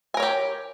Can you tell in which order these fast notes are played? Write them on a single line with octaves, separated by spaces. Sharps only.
G#5 A#4 C#5 G4